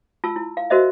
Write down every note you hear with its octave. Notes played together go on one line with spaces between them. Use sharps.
F4 A5 E6
E4
F5
F#4 A#4 C5 D#5 E5